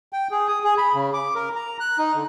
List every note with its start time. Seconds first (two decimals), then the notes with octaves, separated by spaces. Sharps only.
0.13 G5
0.31 G#4
0.48 D#6
0.64 G#4
0.78 B5
0.94 C#3
1.13 D6
1.35 A#4
1.56 A#5
1.80 F#6
1.98 D#4
2.15 D3